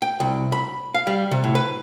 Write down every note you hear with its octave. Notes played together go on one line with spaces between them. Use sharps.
G5
C2
B5
F5
G3
C3
A2
B4